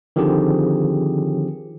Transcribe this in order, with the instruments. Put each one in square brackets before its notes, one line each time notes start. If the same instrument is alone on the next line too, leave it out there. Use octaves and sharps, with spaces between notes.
[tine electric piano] D3 D#3 F3 C4 G4 G#4